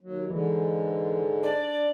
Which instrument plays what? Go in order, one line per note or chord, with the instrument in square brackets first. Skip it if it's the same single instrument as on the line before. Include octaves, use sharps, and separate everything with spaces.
[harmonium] D#2 F#3
[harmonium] G#2 D3 G#3 [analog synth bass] E3
[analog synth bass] D4 [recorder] D5